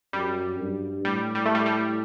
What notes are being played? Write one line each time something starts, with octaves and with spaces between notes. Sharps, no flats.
F#2 G3
G2
A2 G3
G3
A3
G3
G3